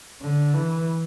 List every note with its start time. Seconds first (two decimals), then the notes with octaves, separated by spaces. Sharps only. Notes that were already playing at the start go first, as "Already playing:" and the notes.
0.22 D3
0.54 E3